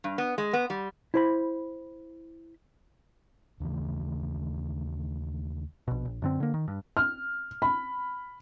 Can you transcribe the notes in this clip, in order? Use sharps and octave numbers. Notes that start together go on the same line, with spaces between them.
G2
B3
G#3
B3
G3
E4 C5 B5
D#2 C#3 E3 A3
A#1 B2
A#1
F#2 D3 C4
D3 A#3
D#3
G2
F6
B5